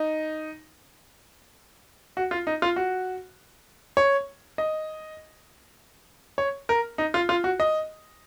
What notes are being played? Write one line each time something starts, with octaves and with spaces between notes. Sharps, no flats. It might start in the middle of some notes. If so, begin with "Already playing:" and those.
Already playing: D#4
F#4
F4
D#4
F4
F#4
C#5
D#5
C#5
A#4
D#4
F4
F4
F#4
D#5